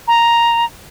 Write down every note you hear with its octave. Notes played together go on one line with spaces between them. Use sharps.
A#5